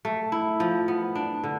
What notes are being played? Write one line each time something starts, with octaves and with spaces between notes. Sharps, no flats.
A3
E4
F3
B3
D4
D3